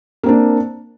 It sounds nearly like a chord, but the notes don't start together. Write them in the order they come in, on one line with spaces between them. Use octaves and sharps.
A#3 C4 D4